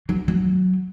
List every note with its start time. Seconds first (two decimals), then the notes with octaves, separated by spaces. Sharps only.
0.09 F#3
0.28 F#3